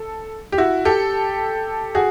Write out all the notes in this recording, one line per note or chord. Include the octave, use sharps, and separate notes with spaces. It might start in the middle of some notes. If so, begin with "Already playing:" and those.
Already playing: A4
G4
E4 F#4
G4 A4
F#4 G#4